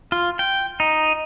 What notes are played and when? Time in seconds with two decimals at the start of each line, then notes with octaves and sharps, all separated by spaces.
0.12 F4
0.39 G5
0.80 D#4